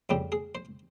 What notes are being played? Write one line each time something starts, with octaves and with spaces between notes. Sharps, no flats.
F2 C#3 G3 C4 G4
G#4
C5